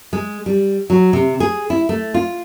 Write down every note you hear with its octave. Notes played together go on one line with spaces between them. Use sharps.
G#3
G3
F#3
C3
G#4
E4
A3
F4